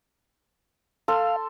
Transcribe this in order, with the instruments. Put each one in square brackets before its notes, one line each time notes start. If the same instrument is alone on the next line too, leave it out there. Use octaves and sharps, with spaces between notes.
[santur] A4 C6 [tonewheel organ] F5